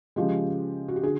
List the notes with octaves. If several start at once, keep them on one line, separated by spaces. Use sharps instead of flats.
C#3 F3 G#3 G4
F#4
G4
D3 F#4 G#4